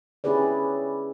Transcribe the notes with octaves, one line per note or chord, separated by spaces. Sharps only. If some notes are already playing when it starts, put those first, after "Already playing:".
C#4 E4 G4 G#4 B4 D5